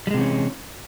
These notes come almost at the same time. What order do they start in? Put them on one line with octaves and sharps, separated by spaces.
G3 G#3 C3 E3 C#4